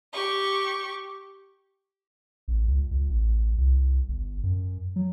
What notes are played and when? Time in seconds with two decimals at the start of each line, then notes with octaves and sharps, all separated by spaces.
0.14 G4 C#6
2.48 A1
2.68 C#2
2.91 C#2
3.09 A1
3.58 C2
4.08 G1
4.43 F#2
4.96 F#3